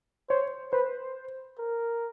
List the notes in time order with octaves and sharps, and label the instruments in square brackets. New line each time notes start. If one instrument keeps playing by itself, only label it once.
[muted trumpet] C5 [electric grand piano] C#5
[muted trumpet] B4 [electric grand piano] C5
[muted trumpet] A#4